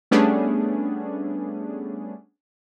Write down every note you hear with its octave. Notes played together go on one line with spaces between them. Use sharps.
G3 A3 B3 C#4 D4 G#4